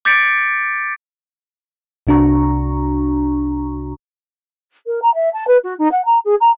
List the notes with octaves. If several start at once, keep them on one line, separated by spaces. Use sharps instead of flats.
D6 G6 A6 B6 C#7 D7
C2 C3 D4 F#4 A#5 C#6
A#4
A#5
E5
A5
B4
F#4
D#4
F#5
A#5
G#4
A#5